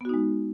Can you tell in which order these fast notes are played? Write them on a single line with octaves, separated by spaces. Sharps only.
B3 F#4 D#4 G#3